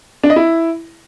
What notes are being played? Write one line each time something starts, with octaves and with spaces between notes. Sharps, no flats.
D4
D#5
E4